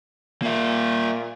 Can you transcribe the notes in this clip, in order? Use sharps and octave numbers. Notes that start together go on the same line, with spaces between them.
A#2 A#3 E5